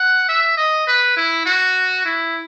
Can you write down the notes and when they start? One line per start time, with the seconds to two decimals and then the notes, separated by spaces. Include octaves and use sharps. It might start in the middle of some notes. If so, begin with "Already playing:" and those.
Already playing: F#5
0.28 E5
0.57 D#5
0.87 B4
1.17 E4
1.46 F#4
2.06 E4